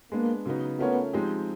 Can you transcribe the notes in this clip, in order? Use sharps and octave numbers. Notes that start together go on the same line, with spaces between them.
G#3 A#3 B3 D4
C#3 F#3 B3 D#4
A3 B3 C#4 F4 A#4 C#5
F3 G#3 C4 D#4 G4